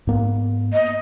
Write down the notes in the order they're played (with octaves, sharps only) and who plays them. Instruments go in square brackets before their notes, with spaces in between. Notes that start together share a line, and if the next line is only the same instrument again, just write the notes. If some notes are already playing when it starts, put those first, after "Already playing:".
[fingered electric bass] G#2 A#3 B3
[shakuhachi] D#5